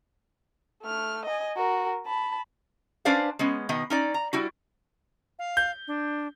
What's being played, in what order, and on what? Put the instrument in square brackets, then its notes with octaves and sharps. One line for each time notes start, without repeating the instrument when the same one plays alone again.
[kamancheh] A3 F6
D#5 G#5
F#4 A#4
A5 B5
[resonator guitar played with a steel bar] C#4 D4 B4 C5 D5 F5
G#3 B3 C#4
B2 D#3 B3 D#5
C#4 D#4 D5
A#5
G3 E4 F#4
[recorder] F5
[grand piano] G6
[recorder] D4